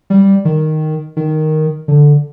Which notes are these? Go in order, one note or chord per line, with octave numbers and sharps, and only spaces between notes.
G3
D#3
D#3
D3